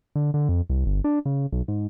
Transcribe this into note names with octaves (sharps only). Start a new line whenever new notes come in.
D3
D3
F2
C2
G1
D4
C#3
B1
G#2